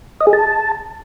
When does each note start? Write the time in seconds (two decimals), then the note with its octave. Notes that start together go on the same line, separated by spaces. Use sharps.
0.21 D#5
0.27 G#4
0.33 A5